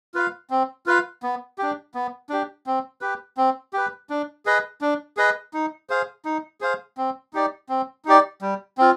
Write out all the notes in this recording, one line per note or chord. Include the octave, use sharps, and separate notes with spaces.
F4 B4 F5
C4
F4 B4 F5
B3
D4 G4
B3
D4 G4
C4
G4 B4
C4
G4 B4
D4
G#4 B4 D#5
D4
G#4 B4 D#5
D#4
G#4 C5 F5
D#4
G#4 C5 F5
C4
D#4 G4 D5
C4
D#4 G4 D5
G3
C4 F4